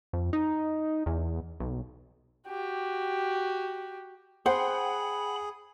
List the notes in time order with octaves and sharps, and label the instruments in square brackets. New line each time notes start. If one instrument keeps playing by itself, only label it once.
[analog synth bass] F2
D#4
E2
B1
[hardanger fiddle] F#4 G4
[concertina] G#4 [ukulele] C5 [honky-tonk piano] F#5 G5 [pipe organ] B5